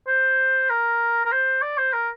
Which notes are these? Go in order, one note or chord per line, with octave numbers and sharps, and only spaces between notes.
C5
A#4
A#4
C5
D5
C5
A#4